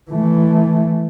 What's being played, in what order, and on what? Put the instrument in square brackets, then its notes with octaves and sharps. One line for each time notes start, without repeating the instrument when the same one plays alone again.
[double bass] E3 A3